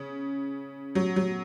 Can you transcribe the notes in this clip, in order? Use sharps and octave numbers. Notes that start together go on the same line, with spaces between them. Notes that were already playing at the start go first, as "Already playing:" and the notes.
Already playing: C#3
F#3
F#3